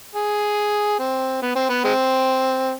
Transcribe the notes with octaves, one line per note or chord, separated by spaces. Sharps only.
G#4
C4
B3
C4
B3
G#3 C4